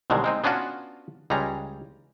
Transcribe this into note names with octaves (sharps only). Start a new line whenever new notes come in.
C2 B2 D3 D#3 F#3 G#3
G#3 C4 D#4
B3 C#4 D4 F4 F#4
C#2 G3 G#3 C#4 A#5